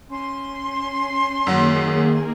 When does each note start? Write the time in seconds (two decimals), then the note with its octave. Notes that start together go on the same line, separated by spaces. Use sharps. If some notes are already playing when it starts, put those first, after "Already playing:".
0.10 C#4 C6
1.47 F#2 D#3 F#3 A#3 C#4 G#4